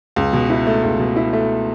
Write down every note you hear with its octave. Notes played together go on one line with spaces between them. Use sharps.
C#2
B2
E4
A3
C#2
B2
E4
A3